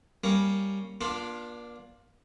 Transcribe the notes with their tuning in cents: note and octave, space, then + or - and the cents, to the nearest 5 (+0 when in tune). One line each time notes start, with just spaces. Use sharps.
G3 +0 A#3 +0 C#4 +0
A#3 +45 D4 +0 F4 +10